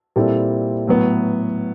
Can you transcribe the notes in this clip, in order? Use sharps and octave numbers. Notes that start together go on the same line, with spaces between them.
A#2 G3 C4 E4 A4
A2 F#3 B3